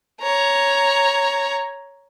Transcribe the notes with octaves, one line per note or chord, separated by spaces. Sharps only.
C#5 A#5